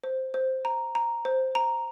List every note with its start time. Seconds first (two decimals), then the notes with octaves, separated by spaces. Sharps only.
0.04 C5
0.34 C5
0.65 A#5
0.95 A#5
1.25 C5
1.55 A#5